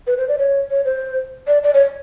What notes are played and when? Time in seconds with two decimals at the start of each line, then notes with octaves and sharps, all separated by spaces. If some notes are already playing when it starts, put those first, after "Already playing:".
0.06 B4
0.17 C5
0.28 D5
0.38 C#5
0.70 C#5
0.85 C5
1.47 D5
1.63 D5
1.73 C#5